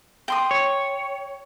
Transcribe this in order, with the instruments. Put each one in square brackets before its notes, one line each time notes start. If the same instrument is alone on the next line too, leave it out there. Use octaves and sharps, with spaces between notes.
[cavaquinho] G5 C6 D#6
[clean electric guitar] C#5